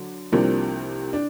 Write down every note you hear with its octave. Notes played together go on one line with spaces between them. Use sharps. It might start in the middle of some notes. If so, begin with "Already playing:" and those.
Already playing: D3 F#3
C2 C3 F3 A#3 D4
D4